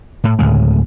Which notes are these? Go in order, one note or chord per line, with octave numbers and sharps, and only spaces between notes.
A2
D2 A2 C#3 G#3